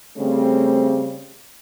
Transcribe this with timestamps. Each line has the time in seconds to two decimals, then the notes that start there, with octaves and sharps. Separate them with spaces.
0.17 C#3 G3 A3 C4